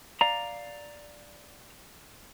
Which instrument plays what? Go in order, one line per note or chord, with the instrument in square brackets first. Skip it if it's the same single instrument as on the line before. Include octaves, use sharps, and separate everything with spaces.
[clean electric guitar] D5 F5 A#5